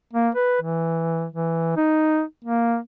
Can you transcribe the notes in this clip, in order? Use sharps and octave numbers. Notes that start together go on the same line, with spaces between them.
A#3
B4
E3
E3
D#4
A#3